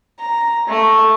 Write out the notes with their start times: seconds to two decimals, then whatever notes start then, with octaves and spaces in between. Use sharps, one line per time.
0.20 A#5
0.68 A3